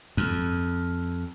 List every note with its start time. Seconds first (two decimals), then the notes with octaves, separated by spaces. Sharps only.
0.17 F2